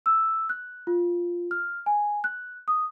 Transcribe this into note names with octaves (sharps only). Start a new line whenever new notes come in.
E6
F#6
F4
F6
G#5
F#6
D#6